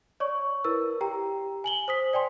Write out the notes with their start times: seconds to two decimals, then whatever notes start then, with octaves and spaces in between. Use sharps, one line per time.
0.20 C#5 D5 C#6
0.64 E4 A#4 B4 E6
1.01 G4 G5 A#5
1.64 G#5 F#7 G7
1.88 C5 D#6 B6
2.13 D5 G5 G#5 C6